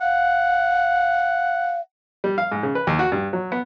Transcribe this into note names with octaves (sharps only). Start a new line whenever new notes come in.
F5 F#5
G3
F5
G#2
C#3
B4
D#2
F#4
G2
F#3
B3